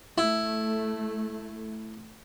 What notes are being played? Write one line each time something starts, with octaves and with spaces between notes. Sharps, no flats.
A3 E4